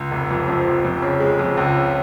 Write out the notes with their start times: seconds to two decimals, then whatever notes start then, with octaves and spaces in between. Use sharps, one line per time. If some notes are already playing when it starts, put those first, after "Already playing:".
Already playing: C#2
0.11 F1
0.31 F2
0.48 F3
0.67 F1
0.85 F2
1.02 C#3
1.20 G#3
1.39 F2
1.57 C#2
1.76 C#3